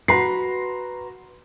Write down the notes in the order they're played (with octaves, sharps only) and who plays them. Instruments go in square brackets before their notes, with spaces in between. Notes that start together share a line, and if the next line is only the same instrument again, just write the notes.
[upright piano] F#4 A#5 C6 [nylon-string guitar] B4 [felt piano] C7